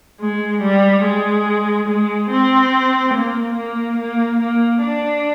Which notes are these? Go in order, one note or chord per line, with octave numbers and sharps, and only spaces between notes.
G#3
G3
G#3
G#3
C4
A#3
A#3
A#3
A#3
D4